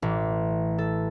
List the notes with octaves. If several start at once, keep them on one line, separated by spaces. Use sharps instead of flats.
A1
A4